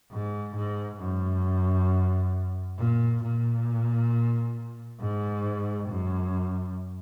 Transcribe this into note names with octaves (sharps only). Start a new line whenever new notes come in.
G#2
G#2
F#2
A#2
A#2
G#2
F#2